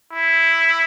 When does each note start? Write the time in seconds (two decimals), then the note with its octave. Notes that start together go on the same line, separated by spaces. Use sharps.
0.12 E4